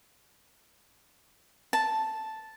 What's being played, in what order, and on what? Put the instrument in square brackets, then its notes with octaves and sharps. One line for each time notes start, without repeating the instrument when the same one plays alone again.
[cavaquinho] A5